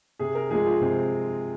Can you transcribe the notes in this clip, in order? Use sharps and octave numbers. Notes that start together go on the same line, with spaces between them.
C3 G#4
A#4
F3 G#3 G#4
F4
C3 C4